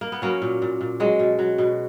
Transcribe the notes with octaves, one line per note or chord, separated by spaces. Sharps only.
A#3
B3
F#3 A#3 C#4
A#2
A#2
A#2
F#3 G#3
B2
F#3
B2